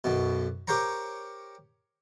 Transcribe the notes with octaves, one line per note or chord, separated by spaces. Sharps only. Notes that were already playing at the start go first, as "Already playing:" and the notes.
B1 F#2 B2
G4 A#4 C5 C#5 A#5